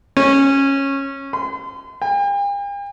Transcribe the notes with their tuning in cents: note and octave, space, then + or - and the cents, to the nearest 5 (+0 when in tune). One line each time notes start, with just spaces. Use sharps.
C#4 -15
C6 -40
G5 +45